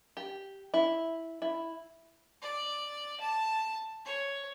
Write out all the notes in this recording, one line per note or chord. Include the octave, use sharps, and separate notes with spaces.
G4
E4
E4
D5
A5
C#5